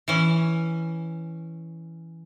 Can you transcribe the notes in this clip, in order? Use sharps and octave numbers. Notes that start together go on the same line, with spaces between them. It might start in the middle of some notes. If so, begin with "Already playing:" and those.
E3 C#4